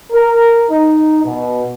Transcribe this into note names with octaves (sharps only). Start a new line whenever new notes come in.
A#4
D#4
B2